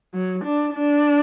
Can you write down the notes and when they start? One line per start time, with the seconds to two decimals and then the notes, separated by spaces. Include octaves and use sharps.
0.14 F#3
0.44 D4
0.74 D4